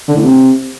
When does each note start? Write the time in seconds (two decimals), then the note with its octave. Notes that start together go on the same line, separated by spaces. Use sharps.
0.08 D3
0.16 A2
0.23 C3